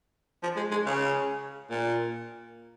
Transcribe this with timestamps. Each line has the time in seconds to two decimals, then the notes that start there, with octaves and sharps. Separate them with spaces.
0.43 F3
0.57 G#3
0.71 G#3
0.86 C#3
1.70 A#2